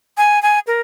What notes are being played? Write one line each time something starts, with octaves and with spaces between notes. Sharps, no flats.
G#5
G#5
A#4